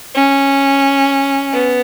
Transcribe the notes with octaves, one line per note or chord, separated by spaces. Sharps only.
C#4
B3